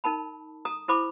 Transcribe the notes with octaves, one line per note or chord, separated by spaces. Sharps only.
D#4 A#4 A5 B5
A4 A#5 D#6
E4 A4 C5 B5 C#6 D6